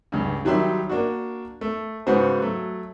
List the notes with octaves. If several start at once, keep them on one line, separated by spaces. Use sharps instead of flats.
C#2 G2
D#3 F#3 G3 E5 C6
A#3 D4 F#4
A3
G#2 C#3 B3 F#4 C5
F#3 A3